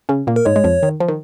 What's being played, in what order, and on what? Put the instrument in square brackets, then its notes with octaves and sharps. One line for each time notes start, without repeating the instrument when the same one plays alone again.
[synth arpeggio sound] C#3 C#4
A#2 A#3
[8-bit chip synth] A#4
[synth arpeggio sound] G#2 G#3 [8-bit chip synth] C#5
[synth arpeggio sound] G#3
F2 F3
D#3
F3
D#3